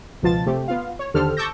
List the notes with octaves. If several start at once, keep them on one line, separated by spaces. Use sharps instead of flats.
C#2 B2 F3 F4 A5 A6
C3 A3 C4 G4
B3 F4 F5
C#5
D#2 D3 G4 A4 C5 F6
A5 C#6 D6 E6 G6 A#6